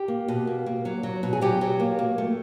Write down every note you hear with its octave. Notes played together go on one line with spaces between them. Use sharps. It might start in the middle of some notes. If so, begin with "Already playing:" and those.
Already playing: G4
A#3
B2
A#3
A#3
F#3
F#3
B2
G#4
F#3 G4
F#3
A#3
A#3
A3